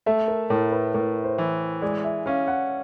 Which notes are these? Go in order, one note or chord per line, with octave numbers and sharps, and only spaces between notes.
A3 E5
A#4
A2 A#4
B4
A2 A#4
C5
E3
G#3 D5
E5
C#4 F5
F#5